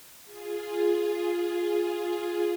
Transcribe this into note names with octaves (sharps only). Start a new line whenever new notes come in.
F4 G#4